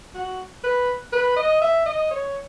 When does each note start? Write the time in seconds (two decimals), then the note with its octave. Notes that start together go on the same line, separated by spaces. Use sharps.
0.14 F#4
0.64 B4
1.12 B4
1.37 D#5
1.62 E5
1.86 D#5
2.11 C#5